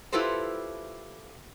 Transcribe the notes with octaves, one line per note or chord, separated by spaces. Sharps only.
E4 F4 G4 A4 B4 C5